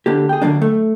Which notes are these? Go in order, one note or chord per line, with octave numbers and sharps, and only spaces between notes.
D3 A#3 G4
G#4 G5
D3 F#3 A#3 D4
A3